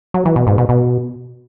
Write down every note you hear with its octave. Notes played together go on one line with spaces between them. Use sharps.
F#3
E3
B2
G#2
B2
B2